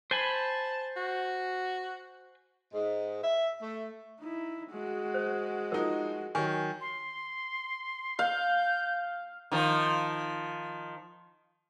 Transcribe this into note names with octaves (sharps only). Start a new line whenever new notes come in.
C5 G#5 A5 B5
F#4
G#2
E5
A3
D#4 E4
G#3 F#4
C5
F3 D#4 A#4
D#3 F#3 G#5 C#6
C6
F5 G6
D#3 F3